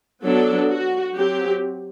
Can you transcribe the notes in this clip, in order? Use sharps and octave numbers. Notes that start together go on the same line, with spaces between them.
F#3 B3 D4 A4
F#4
F#3 C4 G4